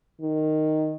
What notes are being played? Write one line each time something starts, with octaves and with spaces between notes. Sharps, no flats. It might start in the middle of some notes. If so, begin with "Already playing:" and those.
D#3